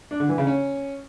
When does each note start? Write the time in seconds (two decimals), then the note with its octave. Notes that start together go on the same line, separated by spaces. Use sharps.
0.11 D4
0.20 D3
0.29 E3
0.38 C#3
0.47 C#4